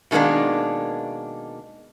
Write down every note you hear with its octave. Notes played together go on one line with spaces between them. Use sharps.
B2 D#3 G#3 A#3 D4